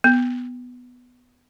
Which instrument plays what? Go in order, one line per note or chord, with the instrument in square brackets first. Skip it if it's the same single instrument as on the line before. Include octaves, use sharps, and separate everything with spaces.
[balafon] B3